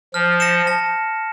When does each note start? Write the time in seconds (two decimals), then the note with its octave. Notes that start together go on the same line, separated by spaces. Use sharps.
0.14 F3 F6
0.40 A#6 C#7 E7
0.67 A5